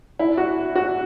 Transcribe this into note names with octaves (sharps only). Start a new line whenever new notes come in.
E4
F#4
F#4